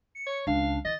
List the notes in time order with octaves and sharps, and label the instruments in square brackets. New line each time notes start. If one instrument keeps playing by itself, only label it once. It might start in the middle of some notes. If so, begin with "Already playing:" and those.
[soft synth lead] C#7
[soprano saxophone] C#5
[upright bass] C#2 [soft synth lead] D4 [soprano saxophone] F5
[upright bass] E3 [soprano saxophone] D#5 [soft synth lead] A6